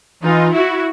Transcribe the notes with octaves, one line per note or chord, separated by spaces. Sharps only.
E3 D#4 F4
E4 F#4